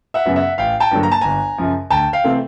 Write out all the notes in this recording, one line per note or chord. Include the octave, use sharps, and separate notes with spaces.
E5 F#5
F#2 C#3 F#3 B3
E5 F#5
A1 F5 G5
G5 A5
G2 D3 F#3 A#3
A#5
A5
G1 G#5 A#5
F#2 C#3 F3
D2 G5 A5
F5 G5
C3 E3 A3 C4